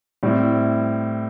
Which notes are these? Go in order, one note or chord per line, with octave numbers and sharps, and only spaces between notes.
A2 G3 C4 E4